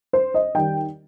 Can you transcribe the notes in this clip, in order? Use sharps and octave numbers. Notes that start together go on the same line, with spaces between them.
C5
D#5
D#3 G3 G5